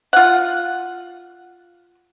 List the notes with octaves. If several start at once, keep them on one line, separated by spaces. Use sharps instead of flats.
F4 F#5